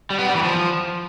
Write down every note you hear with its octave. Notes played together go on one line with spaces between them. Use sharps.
G3
B3
G3
E3
F3